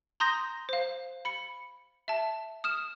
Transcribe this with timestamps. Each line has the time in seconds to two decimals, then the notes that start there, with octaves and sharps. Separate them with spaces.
0.20 A#5 C6 D#6 G6 A#6
0.69 C5 F5
1.25 B5 C#7
2.08 E5 A5
2.64 D#6 F6 E7